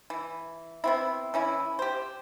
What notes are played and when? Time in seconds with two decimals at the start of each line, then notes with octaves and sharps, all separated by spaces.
0.10 E3
0.84 B3 C4 E4
1.34 E3 C#4 E4
1.79 G4 C5